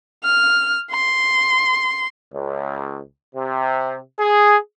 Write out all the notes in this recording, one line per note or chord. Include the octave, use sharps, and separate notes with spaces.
F6
C6
C#2
C3
G#4